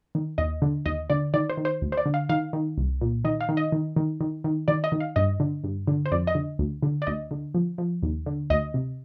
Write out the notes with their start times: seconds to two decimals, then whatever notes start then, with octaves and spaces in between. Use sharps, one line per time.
0.15 D#3
0.38 D#2 D#5
0.62 D3
0.86 D#2 D#5
1.10 D3 D5
1.34 D#3 D5
1.50 C5
1.57 D#3
1.65 C5
1.82 D2
1.92 C5
1.97 D5
2.06 D3
2.14 F5
2.29 D#3 F5
2.53 D#3
2.78 C2
3.01 A#2
3.25 D#3 D#5
3.41 F5
3.49 D#3
3.57 D#5
3.72 D#3
3.96 D#3
4.21 D#3
4.44 D#3
4.68 D#3 D5
4.84 D#5
4.92 D#3
5.00 F5
5.16 G2 D#5
5.40 D3
5.64 G2
5.87 D3
6.06 C5
6.12 F2 D5
6.27 D#5
6.35 D3
6.59 D2
6.83 D3
7.02 D5
7.07 D2 D#5
7.31 D3
7.54 F3
7.78 F3
8.03 D#2
8.26 D3
8.50 D2 D#5
8.74 C3